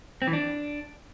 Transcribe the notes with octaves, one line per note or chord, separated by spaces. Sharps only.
C4
E3
D4